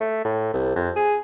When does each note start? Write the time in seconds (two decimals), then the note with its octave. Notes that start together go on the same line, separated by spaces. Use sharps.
0.01 A3
0.24 A2
0.54 C2
0.76 F2
0.96 G#4